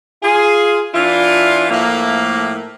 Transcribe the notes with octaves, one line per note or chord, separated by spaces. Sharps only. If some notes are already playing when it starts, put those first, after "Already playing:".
F4 G#4
E3 D4 E4 F4
A2 F3 A3 A#3